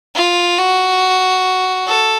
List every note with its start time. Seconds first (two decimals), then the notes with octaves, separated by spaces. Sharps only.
0.15 F4
0.59 F#4
1.87 A4